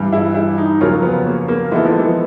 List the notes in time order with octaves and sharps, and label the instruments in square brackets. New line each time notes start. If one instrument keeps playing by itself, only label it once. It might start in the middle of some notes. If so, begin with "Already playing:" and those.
Already playing: [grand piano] G2 E3 G3
[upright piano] E4
E4
D#4
[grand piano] F2 C#3 F#3 A#3 C#4 [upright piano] F4
[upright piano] B3
A#3
A#3
[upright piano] E3 [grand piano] G#3 B3 E4 A4
[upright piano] F3
E3